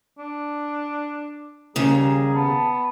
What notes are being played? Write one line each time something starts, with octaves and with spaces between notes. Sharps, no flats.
D4
D#2 C#3 G3 G#4 A#5
B3 A5